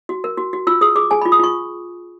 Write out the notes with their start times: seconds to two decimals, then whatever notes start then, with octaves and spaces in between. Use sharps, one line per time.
0.09 F#4
0.24 A#4
0.38 F#4
0.53 F#4
0.67 F4 E6
0.81 G#4 D#6
0.96 G#4 D6
1.11 G#4 G#5
1.21 B5
1.25 F4
1.32 D#6
1.39 F4 C#6